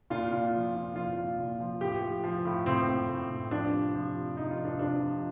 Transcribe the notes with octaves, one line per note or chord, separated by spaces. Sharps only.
A#2 F4
A#2
F3
A#2
F3 F4
A#2
A#2
F3
A2 G4
F3
F3
A2
A2 C4
A2
A2
A2
F3 D4
C3
F3
C3
F3 D#4
F4
C3
D4
C3 D4
F3